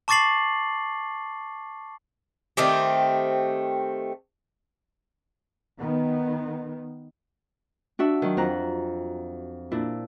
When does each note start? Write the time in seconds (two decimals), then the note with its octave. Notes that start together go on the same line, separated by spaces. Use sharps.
0.08 A5 C#6 D6 A6 C7 F#7
2.57 D#3 A3 C4 G4
5.77 D#3 B3
7.99 D4 F#4 E5
8.22 D#3 F#3
8.37 F2 C4 A#5 F#6
9.72 A#2 D4 E4